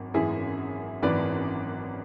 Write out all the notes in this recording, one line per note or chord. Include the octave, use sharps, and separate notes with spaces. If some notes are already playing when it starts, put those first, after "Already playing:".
Already playing: G#1 F#2
G#1 F#2 E3 E4 G#4
G#1 F#2 E3 B4 D5